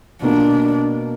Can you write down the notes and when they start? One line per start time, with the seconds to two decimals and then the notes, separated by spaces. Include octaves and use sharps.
0.22 B2 A#3 D4 F4